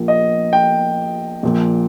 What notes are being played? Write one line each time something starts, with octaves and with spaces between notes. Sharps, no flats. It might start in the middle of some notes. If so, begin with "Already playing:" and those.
Already playing: A#1 A#2 A#3
D#5
G5
A#1 A#2 F3